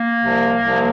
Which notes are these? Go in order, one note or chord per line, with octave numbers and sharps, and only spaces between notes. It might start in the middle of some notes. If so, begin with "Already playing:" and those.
Already playing: A#3
C2 C3 F3
C2 C3 F3